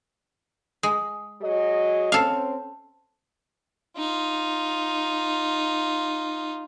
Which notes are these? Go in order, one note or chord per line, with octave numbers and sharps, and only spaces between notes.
G#3
F#3 G#4 D#5
C4 C#4 A4 F5
D#4 F4